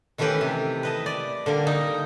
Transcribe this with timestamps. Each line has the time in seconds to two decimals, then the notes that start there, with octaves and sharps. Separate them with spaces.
0.18 D#3 E3 A3 C#4 G4 B4
0.41 C3
0.83 B4 D#5 A5
1.06 D5
1.46 D3 G3 A#3 A#4
1.67 D#4